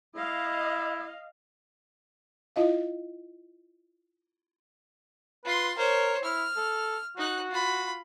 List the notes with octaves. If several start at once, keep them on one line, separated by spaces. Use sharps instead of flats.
E4 D#5 F5
E4 F4 D#5 F5
F4 B4 C6
A#4 C5 C#5
E4 F6
A4
D#4 F#4 F#6
F4 B5